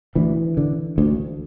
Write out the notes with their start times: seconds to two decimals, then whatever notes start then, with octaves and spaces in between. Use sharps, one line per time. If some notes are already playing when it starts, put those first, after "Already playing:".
0.15 D2 E3
0.57 D3
0.98 D2